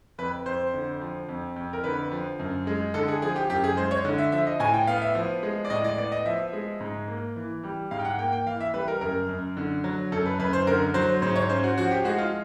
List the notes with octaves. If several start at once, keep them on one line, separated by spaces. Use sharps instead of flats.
F2 B4
F2 C5
D3
F3
F2
F2
A#4
D3 B4
F3
F#2
G#3
D3 A4
G#4
F3 G#4
G4
F#2 G4
G#4
G#3 C5
C#5
D3
E5
F3 E5
D#5
A2 G#5
G5
B3 F5
E5
F3
G#3
D5
A2 D#5
D5
B3 D5
D#5
F3 E5
G#3
G#2
A#3
E3
G3
G#2 F5
G5
F#5
A#3 G5
G5
E3 F5
E5
G3 B4
A#4
F#2 A#4
F#2
D3
F#3
F#2 A4
B4
F#2 B4
C5
D3 A#4
F#3 C5
G#2 C5
C#5
C#4 C5
F#4
F3 F#4
G4
G#3 F#4
F4